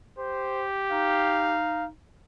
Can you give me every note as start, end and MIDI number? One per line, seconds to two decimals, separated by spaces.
0.19 1.58 67
0.19 0.65 72
0.92 1.88 63
0.92 1.85 77